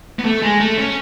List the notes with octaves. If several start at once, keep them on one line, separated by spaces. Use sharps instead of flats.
B3
A3
G#3
A3
C#4